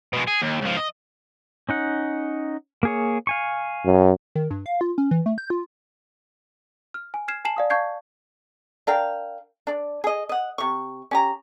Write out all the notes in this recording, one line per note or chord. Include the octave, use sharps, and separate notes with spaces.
B2 G#3
G#4
D#2
C#2 F3
D#5
C#4 D#4 F#5
A#3 G#4 C#5
F5 G#5 C#6
F#2
D#3
G2
F5
F4
C#4
E3
A3
G6
F4
F6
G#5
F6 G#6 C7 E7
G#5 A5 C7 E7 F#7
D5 F5 D#6
F5 A5 C#6 G6 G#6 C7
D4 A#4 F5 G5
D4 D5
G#4 D#5
D#5 F#5
C3 C#6
C#4 G4 A#5